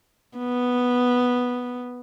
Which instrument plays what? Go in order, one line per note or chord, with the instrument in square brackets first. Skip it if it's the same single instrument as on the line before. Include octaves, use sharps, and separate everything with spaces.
[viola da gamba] B3